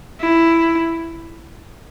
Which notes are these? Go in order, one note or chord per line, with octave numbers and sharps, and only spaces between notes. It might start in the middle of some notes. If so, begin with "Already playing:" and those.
E4